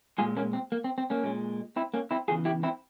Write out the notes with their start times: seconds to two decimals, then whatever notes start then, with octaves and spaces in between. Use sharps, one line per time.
0.18 A#2 G#3 F4 G#4
0.37 A#3 C#4
0.53 C4
0.72 A#3
0.84 C4
0.98 C4
1.10 A#3 C#4
1.24 A#2 G#3
1.76 C4 E4
1.94 A#3 C#4
2.11 C4 E4
2.28 E2 C#3 E3 F4 G#4
2.45 E4 G4
2.63 C4 E4